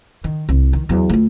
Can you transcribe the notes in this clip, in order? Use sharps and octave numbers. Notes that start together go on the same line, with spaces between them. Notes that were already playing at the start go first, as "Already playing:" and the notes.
D#3
C2
D#3
E2 F#3
D2 F4